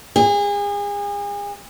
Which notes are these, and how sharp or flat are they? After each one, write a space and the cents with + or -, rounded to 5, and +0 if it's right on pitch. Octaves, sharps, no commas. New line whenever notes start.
G#4 -35